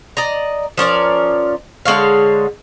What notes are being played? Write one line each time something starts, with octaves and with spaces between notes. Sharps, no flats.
D5 D#5 A#5
F3 C#4 A#4 D5
D3 G#3 C#5 F5